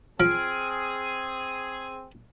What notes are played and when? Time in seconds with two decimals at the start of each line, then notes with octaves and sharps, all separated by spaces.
0.20 F3 C4 G#4 F6 D7